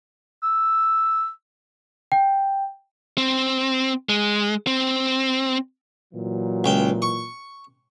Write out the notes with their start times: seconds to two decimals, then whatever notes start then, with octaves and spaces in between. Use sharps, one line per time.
0.43 E6
2.12 G5
3.18 C4
4.09 G#3
4.67 C4
6.13 A#2 E3 F#3
6.64 C#2 G5
7.02 C#6